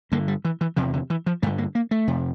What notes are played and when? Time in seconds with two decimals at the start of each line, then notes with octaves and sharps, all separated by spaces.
0.12 G2 D3 A#3
0.28 G3
0.45 E3
0.61 E3
0.76 E2 C3 F3
0.93 D3
1.10 E3
1.26 F3
1.42 G2 D3 A3
1.58 A#3
1.75 A#3
1.91 A3
2.08 F2 C3